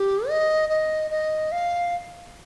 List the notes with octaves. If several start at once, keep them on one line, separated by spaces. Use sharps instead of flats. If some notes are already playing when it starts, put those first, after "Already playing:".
Already playing: G4
D#5
D#5
D#5
F5